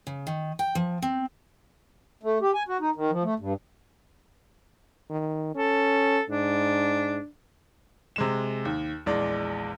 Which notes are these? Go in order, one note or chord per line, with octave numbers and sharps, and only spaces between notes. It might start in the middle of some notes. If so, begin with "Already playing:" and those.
C#3
D#3
G5
F3
C4
A3
G4
G#5
F#4
D#4
D#3
F3
A3
G2
D#3
C#4 A4
G#2 D4
C3 G#3 E7
D#2
A#1 E2 G#3 D5